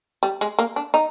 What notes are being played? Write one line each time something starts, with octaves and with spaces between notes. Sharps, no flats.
G3
G#3
A#3
D4
D#4